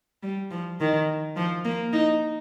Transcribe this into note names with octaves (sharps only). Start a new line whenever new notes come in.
G3
F3
D#3
F3
A#3
D#4